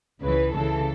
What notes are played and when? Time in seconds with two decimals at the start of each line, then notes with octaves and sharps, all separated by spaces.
0.22 C#2 C#3 E3 B4
0.54 C#2 C#3 E3 A4